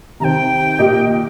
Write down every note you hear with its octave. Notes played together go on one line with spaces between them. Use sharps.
C3 D#3 C4 G5 A#5
A#2 A#3 G4 D#5